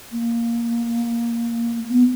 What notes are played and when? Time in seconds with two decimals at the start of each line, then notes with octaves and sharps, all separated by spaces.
0.12 A#3
1.89 B3